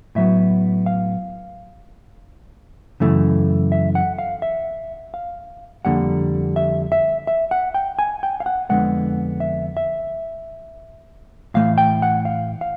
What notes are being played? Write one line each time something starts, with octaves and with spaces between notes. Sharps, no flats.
A2 F#3 B3 E5
F5
F#2 C#3 E3 A3
E5
F#5
F5
E5
F5
F2 D3 G3 A#3 F#5
E5
E5
E5
F#5
G5
G#5
G5
F5
F#5
F2 D3 F3 G#3 B3 F#5
E5
E5
A2 E3 A3 F5
G5
F#5
F5
F5